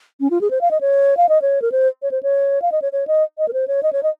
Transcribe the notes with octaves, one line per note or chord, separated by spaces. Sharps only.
C#4
F4
G#4
C5
F5
D#5
C#5
F5
D#5
C#5
A#4
C5
C#5
C5
C#5
F5
D#5
C#5
C#5
D#5
D#5
A#4
C5
C#5
D#5
C#5
D#5